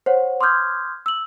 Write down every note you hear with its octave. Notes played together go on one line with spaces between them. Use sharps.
C5 C#5 F#5
C6 D6 D#6 F6 G6 G#6
E6 F#7